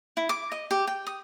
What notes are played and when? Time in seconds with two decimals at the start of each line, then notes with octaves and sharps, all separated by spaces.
0.17 E4
0.29 D6
0.52 D#5
0.71 G4
0.87 G5
1.07 D#6